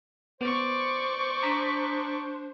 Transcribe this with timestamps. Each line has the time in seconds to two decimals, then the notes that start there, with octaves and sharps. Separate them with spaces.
0.41 B3 C5 D5 C#6
1.43 D4 A#5 D#6 B6